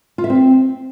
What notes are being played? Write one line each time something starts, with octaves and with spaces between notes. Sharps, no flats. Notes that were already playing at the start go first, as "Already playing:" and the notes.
F4
E5
C4